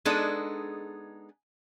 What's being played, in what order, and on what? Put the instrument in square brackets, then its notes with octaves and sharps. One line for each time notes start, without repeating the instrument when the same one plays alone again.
[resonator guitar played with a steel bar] G#3 B3 D4 D#4 G#4 A4